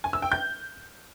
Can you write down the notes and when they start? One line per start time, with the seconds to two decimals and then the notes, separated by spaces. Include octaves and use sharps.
0.04 G#5
0.13 E6
0.22 G5
0.32 G6